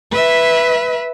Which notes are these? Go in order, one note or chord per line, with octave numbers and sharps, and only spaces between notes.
B4 E5